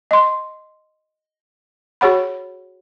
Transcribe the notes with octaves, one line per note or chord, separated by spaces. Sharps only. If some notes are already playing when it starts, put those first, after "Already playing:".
D#5 C6
F#4 G#4 C#5 F#5 B5